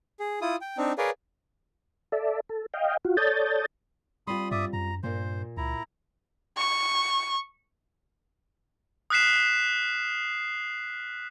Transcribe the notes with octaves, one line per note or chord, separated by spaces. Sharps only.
G#4
E4 F4 D#6
G5
C4 D4 D#4
G#4 A#4 B4 C#5 D5 F5
A4 D5 E5
A4
D#5 F5 G5
F4 F#4
A4 C#5 D5 D#6 G6 A6
G3 C4 F4 B5 C6 D#6
G2 D5 E5 D#6
F#2 A#5
G2 A#2 A#3 C5
C#2 E4 A#5
C#6
D#6 F6 F#6 B6 C7 E7